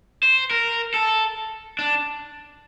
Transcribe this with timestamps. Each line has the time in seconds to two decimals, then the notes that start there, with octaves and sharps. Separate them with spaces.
0.23 C5
0.51 A#4
0.94 A4
1.79 D4